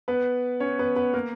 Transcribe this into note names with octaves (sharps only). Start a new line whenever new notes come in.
B3 B4
C#4 C#5
B3 B4
B3 B4
A#3 A#4